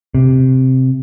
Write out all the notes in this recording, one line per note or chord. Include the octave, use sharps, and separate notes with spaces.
C3